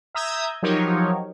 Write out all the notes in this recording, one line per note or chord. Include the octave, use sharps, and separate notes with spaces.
E5 A#5 D#6 E6 G6 G#6
F3 F#3 D#4 G4 A#4 C#5